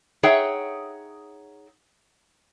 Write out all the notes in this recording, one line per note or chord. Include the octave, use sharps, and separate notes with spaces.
D#4 G#4 C#5 E5 F#5 G5